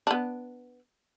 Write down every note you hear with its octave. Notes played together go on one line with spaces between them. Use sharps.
B3 D4